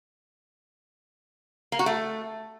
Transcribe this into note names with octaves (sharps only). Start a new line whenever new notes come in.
A#3
F#4
A3